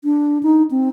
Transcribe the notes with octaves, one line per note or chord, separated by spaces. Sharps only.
D4
D#4
C4